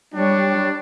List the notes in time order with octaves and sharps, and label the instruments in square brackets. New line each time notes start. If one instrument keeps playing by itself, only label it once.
[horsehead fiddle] G3 C#5 [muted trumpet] D4